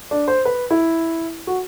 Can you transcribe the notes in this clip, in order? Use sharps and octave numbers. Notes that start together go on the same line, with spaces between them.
D4
C5
B4
E4
F#4